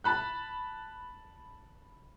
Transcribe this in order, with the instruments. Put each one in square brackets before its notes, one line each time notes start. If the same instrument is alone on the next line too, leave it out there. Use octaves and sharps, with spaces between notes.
[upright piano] A5 B5 F#6